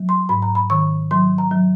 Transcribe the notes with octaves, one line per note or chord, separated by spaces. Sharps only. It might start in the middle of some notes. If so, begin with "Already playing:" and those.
Already playing: F#3
C6
G#2 B5
A#5
B5
D#3 C#6
F#3 C6
A#5
F#3